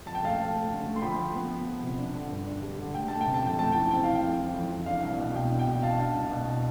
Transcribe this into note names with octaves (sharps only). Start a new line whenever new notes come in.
F2 A5
G5
A3 F5 A5
A3
A3
D3
A3
C6
F3 G5 B5
F3
B3
B3
F3
C3
D4
D3
G2
D4
G3
D3
A3 G5
A3 A5
G5
C3
A5
F2 G5
A3 A5
E3 G5
C4 G5
E3 F5
G5
F2
E3
F2
E3
D4 F5
C2
B2
B2 G5
D4
G5
B2
D4 F5 A5
D4
C2
B2